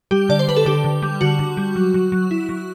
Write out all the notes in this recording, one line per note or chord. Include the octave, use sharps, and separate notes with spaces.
G3 G4
D3 D5
C5
D3 B4
A4
D3 G4
D3
G3
D3 F#4
D3
G3
F#3
F#3
F#3
E4
F#3